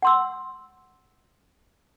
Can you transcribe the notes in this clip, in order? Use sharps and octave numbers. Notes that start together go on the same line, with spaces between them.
F#5 C6 E6